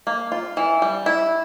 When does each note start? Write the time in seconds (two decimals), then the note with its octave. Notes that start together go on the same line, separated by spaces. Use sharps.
0.07 A#3
0.32 F4
0.57 E3
0.82 G3
1.06 E4